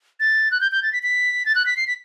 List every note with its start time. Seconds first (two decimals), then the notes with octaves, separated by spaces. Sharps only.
0.20 A6
0.51 F#6
0.61 G6
0.72 G6
0.83 A6
0.93 B6
1.03 B6
1.46 A6
1.55 F#6
1.66 B6
1.77 C7
1.87 B6